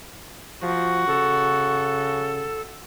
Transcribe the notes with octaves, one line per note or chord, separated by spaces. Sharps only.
F3 F#4
C#3 A4